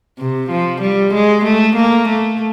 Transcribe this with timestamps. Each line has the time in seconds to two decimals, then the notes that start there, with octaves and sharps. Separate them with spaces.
0.19 C3
0.51 F3
0.82 G3
1.14 G#3
1.45 A3
1.76 A#3
2.09 A3